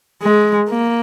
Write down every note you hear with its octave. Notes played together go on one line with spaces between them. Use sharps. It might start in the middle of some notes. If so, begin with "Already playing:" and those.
G#3
A#3